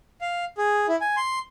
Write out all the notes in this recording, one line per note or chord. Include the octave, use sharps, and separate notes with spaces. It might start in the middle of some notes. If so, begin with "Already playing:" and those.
F5
G#4
E4
G#5
C6